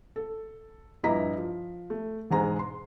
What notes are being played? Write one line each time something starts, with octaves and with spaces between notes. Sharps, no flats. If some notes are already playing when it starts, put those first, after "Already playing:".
A4
A#1 G2 E4 D#5 A#5 B6
F3
A3
E1 G#2 G#3 A#5
C6